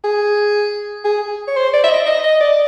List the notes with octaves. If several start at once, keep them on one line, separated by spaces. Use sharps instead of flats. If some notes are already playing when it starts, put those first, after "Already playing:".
G#4
G#4
C#5
C5
D5
E5
D#5
D#5
D#5
D5